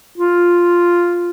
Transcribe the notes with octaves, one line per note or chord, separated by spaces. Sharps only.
F4